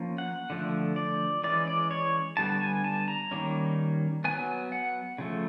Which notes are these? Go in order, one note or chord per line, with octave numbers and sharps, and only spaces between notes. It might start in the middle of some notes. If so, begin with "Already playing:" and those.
Already playing: F3 A#3 C#4
F#5
D3 F3 A3
D5
E3 G#3 C#4 D5
D5
C#5
D3 G3 B3 A5
G#5
A5
A#5
D#3 G3 A#3 C#4
F#3 B3 G#5
F#5
C#3 F3 A3